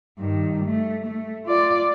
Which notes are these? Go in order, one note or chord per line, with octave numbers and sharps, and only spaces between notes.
G2 D#3
A3
A3
F4 D5